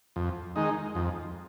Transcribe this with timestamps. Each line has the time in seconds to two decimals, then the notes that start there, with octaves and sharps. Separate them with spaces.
0.16 F2
0.56 D#3 G#3 D#4
0.95 F2